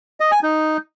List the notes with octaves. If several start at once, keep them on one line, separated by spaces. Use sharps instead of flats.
D#5
G#5
D#4